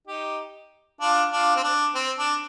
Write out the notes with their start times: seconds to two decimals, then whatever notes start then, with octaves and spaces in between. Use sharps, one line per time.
0.07 D#4 G4
1.01 D4 F4
1.32 D4 F4
1.56 C4
1.64 D4
1.95 C4
2.18 D4